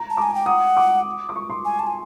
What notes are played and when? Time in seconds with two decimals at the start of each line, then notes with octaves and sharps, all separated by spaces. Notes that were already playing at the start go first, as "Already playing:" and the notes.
Already playing: A#5
0.10 A5
0.17 G#5 D6
0.35 G5
0.46 F#5 D#6
0.77 D6
1.29 D6
1.36 C#6
1.50 C6
1.65 G#5
1.79 A5
1.87 G#5